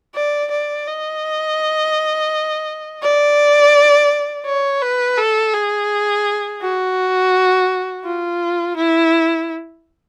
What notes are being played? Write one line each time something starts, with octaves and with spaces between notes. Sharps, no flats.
D5
D5
D#5
D5
C#5
B4
A4
G#4
F#4
F4
E4